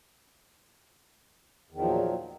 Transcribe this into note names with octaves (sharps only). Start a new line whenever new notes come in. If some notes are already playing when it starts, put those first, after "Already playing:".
E2 A#2 D#3 F3 F#3